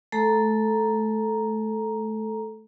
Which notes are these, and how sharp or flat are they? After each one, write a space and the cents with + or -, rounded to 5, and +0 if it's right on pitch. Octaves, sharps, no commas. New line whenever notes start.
A3 -30 A4 +0 A#5 +5